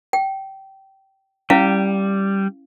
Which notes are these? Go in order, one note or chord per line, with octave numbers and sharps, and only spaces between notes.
G5
G3 C#4 E4 F5